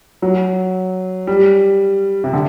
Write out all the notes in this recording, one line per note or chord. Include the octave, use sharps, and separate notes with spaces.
F#3
G3
C3
D3